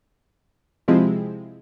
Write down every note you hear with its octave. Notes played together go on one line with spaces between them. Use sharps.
C3 F3 G#3 C4 E4